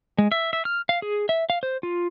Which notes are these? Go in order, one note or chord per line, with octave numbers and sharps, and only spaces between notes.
G#3
E5
E5
F6
F5
G#4
E5
F5
C5
F4